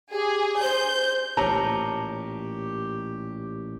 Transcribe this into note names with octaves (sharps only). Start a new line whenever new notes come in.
G4 G#4
C5 G6
A1 A#2 G4 C#5 A5 A#5 E6